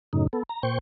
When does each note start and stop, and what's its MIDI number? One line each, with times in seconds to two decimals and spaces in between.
0.13 0.27 42
0.13 0.27 45
0.13 0.27 49
0.13 0.27 63
0.33 0.43 59
0.33 0.43 69
0.49 0.63 82
0.63 0.79 46
0.63 0.79 72
0.63 0.79 79
0.63 0.79 85